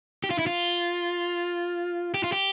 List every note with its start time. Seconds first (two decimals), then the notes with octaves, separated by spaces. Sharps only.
0.24 G4
0.31 F4
0.39 E4
0.47 F4
2.14 G4
2.24 F4
2.32 G4